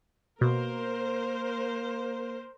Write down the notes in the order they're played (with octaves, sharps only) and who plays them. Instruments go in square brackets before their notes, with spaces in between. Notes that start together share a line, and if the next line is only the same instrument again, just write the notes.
[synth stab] B2 [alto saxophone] A#3 [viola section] A#4 C5